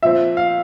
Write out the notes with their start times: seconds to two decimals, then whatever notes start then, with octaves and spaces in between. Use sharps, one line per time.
0.03 A#2 F3 C4 E5
0.37 F5